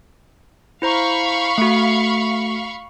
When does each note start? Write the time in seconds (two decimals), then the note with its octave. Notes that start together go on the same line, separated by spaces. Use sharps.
0.82 E4 C5 F5 A#5 B5 C#6
1.58 A3 F#4